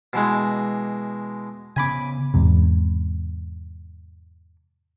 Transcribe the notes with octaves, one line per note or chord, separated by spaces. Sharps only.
B2 E3 G#3
C#3 B3 G#5 B5 D6
E2 G#2 C3